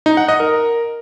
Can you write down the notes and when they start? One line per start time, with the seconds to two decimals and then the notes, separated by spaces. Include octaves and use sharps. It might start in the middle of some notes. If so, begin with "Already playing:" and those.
0.06 D#4
0.17 F#5
0.28 D#5
0.40 A#4